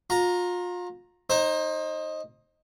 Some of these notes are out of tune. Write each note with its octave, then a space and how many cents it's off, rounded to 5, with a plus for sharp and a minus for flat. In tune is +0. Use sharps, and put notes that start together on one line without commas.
F4 +35 A#5 +0
D#4 +0 C5 +30